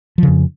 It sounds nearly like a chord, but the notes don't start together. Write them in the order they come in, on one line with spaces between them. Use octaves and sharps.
F3 C#3 F2